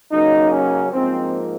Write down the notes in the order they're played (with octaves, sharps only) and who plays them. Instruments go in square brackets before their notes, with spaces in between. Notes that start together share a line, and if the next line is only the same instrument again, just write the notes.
[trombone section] C#3 F#3 A#3 D#4
C#4
G#2 F3 A#3 C4